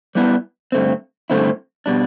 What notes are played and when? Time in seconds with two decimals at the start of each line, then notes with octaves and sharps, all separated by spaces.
0.15 G3 B3 E4
0.72 G2 D3 A3 C4
1.30 G2 D3 A3 C4 E4
1.86 B2 G3 D4